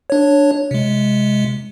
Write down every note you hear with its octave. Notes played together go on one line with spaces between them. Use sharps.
D4 C#5
C3 G#3